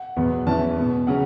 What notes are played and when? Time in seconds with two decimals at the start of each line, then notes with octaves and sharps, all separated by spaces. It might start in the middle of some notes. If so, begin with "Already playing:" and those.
Already playing: F#5
0.17 E2 B2 F#3 B3
0.47 E2 E3 C#4 A5
0.77 B2 B3
1.07 C#3 F#3 C#4 F#5